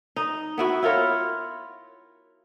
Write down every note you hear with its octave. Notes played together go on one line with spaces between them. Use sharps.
D#4
B3 E4 F#4
E4 F4 A#4 C#5